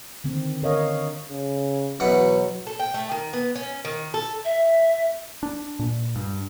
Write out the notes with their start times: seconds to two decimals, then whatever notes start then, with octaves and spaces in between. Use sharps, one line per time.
0.24 D3 D#3 C4
0.62 D3 A#4 C#5 D#5 F5
1.29 C#3
2.00 E2 B2 F#3 F#5
2.67 A4
2.79 G5
2.94 A3
3.11 D#3
3.33 B3
3.56 C#4
3.85 D#3
4.14 A4
4.45 E5
5.43 D4
5.79 A#2
6.16 G2